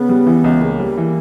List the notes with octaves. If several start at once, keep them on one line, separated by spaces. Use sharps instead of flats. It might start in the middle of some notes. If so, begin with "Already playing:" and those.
Already playing: C#3 B3
G3
E3
C#2
C#3 A#3
G3
E3